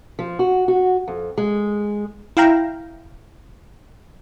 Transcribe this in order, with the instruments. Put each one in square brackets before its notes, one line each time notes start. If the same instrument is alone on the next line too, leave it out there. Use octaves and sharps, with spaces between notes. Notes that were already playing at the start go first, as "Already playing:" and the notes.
[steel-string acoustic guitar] F3
F#4
F#4
F2
G#3
[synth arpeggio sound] E4 F5 G5 A#5